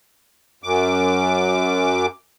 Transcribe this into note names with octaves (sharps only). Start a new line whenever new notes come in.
F#2 D6